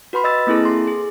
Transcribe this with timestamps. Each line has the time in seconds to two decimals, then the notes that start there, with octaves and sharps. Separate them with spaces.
0.13 F#4 B4 B5 C6
0.24 D#5 E6 A6
0.47 A#3 C4 E4 G#4 A4
0.65 C6
0.87 G#4